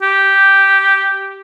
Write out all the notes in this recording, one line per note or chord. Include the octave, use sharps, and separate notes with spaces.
G4